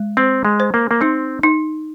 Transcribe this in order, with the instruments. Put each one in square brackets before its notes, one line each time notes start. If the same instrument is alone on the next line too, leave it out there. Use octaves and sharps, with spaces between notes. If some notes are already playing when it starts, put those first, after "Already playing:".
Already playing: [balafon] G#3
[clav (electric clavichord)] C4 [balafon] C5
[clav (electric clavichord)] G#3
[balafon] C5
[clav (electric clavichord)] A#3
A#3
[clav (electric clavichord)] C4 [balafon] D#4
[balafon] D#4